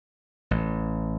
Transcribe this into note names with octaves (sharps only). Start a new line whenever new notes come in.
A1